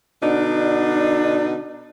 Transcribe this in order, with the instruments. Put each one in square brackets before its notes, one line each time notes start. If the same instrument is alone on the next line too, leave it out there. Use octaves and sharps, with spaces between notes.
[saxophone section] B2 D3 D4 D#4